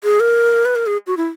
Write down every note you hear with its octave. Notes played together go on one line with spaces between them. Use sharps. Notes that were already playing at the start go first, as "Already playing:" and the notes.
G#4
A#4
B4
A#4
G#4
F#4
E4